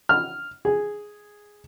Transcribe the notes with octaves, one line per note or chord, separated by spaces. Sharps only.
F6
G#4